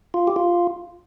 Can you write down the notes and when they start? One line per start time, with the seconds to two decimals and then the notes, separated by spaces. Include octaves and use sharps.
0.14 F4
0.27 G4
0.36 F4